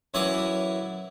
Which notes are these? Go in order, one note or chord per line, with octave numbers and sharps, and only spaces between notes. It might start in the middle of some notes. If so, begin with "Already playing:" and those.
F#2 E3 E4 C#5 D6 D#6